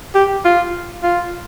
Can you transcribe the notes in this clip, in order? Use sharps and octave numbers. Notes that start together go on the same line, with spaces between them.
G4
F4
F4